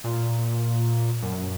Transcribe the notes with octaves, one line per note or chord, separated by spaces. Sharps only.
A#2
F#2